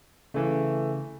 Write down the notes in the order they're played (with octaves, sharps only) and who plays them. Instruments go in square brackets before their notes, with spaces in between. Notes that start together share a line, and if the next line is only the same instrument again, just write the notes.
[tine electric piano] C#3 [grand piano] E3 A3